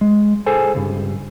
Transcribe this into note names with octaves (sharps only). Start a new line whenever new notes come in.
G#3
G#4 A4 C5 G#5
C#2 G2